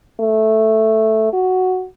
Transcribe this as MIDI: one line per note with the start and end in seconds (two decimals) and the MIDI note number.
0.20 1.33 57
1.33 1.86 66